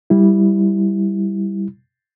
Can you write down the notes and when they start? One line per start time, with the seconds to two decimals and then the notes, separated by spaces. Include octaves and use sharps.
0.10 G3 E4